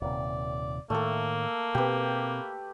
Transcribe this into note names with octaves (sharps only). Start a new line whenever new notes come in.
D#1 C3 D5
A2 D#3 A3 A#3 A4
B2 C4 G4 B4